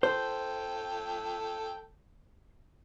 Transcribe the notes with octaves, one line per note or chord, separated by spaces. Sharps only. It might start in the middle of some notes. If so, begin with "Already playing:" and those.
A4 C5 G5